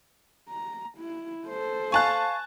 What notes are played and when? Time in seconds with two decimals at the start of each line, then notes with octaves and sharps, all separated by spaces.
0.49 A#5
0.98 E4
1.47 A4 C5
1.92 F5 G#5 A5 C#6 F#6